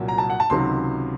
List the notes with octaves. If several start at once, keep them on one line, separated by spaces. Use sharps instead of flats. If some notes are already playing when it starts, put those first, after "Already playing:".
Already playing: C2 A#2 F#3
A#5
A5
F#5
A5
C#2 C3 D#3 F#3 C6